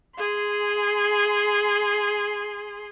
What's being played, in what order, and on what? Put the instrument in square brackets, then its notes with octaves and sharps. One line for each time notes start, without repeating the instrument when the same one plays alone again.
[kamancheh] G#4 C6